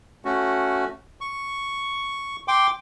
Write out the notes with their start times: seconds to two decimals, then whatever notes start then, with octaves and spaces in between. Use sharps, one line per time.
0.25 A3 C#4 F#4
1.21 C#6
2.48 G5 C6 D6